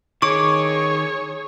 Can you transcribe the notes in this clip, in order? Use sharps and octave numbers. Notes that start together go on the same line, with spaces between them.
D#3 G#4 C#5 C#6 D6